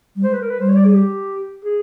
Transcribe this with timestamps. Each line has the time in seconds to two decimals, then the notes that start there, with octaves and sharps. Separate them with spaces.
0.16 G3
0.24 G#3 C5
0.33 B4
0.41 A#4
0.50 B4
0.58 G3 C5
0.69 C#5
0.76 D5
0.85 G#4
0.94 G4
1.64 G#4